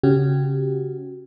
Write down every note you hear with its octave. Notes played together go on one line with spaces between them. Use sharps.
C#3 C#4 F#4 G4